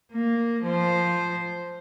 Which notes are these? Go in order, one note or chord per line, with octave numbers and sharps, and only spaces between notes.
A#3
F3 C5